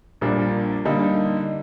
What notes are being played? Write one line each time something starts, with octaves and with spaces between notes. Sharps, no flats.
A#1 A#2 G3 A#3 D4
D3 G3 A#3 D#4